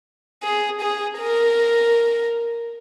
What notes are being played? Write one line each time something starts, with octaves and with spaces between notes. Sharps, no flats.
G#4
G#4
A#4